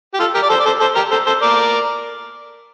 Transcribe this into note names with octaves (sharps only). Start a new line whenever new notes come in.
G4
F4 A4
G4 A#4
D5
A4 C5
D5
A4 C5
A4 C5
G4 A#4
A4 C5
A4 C5
A#4 D5